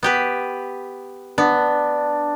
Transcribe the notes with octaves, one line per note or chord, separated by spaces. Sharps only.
B3 G4 B4
B3 D4